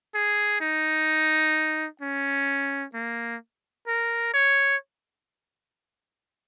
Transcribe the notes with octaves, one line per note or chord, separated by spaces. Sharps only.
G#4
D#4
C#4
A#3
A#4
C#5